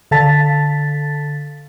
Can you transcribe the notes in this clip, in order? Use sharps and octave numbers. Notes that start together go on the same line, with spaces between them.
D3 A4 F5 A5 A6 B6